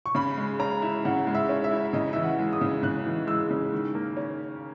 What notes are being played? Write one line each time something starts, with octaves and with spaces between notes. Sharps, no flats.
C#6
C#3 B5
G#3
C#4 A#5
E4
C#3 F#5
G#3
E5
C#4
E5
E4
C#3 D#5
E3 E5
F#5
G#3
D#6
C#3
C#3 F#6
E3
G#3 E6
C#3
D#3
A#3
C#4